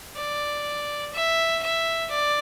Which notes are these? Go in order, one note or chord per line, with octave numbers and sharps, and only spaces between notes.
D5
E5
E5
D5